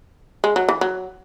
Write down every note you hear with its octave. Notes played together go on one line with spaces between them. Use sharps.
G#3
F#3
E3
F#3